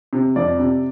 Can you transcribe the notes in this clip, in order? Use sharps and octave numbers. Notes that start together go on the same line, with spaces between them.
C3
F2 D5
C3